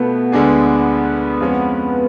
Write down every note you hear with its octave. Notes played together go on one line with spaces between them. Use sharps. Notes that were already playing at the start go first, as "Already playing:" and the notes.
Already playing: B2 A3 B3 F4
D2 D3 G#3 D4 G#4
F2 F3 G#3 C#4